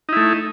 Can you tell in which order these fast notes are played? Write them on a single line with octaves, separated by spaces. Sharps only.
D#4 E4 A3